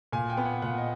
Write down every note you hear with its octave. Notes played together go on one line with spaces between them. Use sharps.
A#2 G#5
G5
B3
F#5
A#2 F#5
D#5